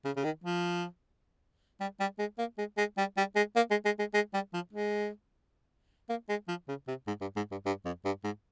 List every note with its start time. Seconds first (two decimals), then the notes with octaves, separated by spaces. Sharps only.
0.05 C#3
0.16 C#3
0.24 D#3
0.44 F3
1.80 G3
2.00 G3
2.19 G#3
2.38 A#3
2.58 G#3
2.78 G#3
2.98 G3
3.17 G3
3.36 G#3
3.56 A#3
3.71 G#3
3.85 G#3
3.99 G#3
4.14 G#3
4.34 G3
4.54 F3
4.73 G#3
6.09 A#3
6.29 G#3
6.48 F3
6.68 C#3
6.88 C3
7.07 G#2
7.21 G2
7.36 G#2
7.51 G2
7.66 G2
7.85 F2
8.05 G2
8.24 G#2